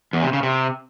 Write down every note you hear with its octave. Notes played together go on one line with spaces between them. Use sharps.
E2
C3
C#3
C3